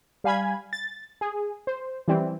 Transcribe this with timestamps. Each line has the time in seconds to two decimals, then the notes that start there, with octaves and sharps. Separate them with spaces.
0.24 G3 F5 G#5 B5 G#6
0.73 A6
1.21 G#4
1.67 C5
2.08 E3 G3 C4